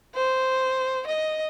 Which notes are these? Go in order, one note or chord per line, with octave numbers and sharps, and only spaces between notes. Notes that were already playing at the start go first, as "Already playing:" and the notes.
C5
D#5